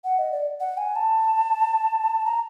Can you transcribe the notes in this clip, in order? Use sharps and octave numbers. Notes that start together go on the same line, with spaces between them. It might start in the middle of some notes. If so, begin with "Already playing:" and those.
F#5
D#5
D5
F#5
G#5
A5
A#5